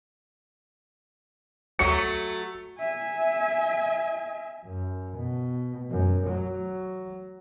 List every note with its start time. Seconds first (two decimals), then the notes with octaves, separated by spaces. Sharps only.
1.79 F#3 A3 F#4 C#7
2.79 E5 G#5
4.65 F#2
5.18 B2
5.90 F#2
6.27 F#3